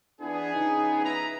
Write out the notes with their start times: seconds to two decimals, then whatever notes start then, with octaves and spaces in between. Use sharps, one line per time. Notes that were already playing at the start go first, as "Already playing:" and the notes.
0.21 E3 B3 D4 G#4
0.54 C#3 F3 D#4
1.04 E4 B4 A#5